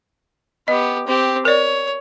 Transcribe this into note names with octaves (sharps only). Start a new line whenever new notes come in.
B3 G4 D#5
C4 G4
A#4 C#5 D5